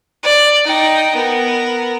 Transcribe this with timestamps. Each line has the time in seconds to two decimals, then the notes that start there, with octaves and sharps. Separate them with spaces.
0.23 D5
0.66 D#4 G5
1.15 B3 A#4